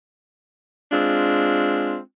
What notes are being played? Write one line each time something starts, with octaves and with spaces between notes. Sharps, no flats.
G#3 C4 D4 F4